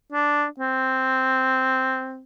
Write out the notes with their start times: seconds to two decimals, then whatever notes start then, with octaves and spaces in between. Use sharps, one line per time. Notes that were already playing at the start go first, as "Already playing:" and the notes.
0.12 D4
0.60 C4